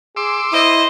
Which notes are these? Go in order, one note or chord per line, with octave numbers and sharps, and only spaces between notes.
G#4 C6 D6 E6
E4 C5 D#5